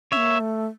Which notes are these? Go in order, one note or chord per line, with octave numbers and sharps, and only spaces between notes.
A#3 C#4 C#5 E5
A3